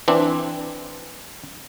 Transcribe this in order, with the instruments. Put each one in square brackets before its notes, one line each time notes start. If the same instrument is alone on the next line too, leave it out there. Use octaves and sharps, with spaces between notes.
[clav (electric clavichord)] E3 C4 D4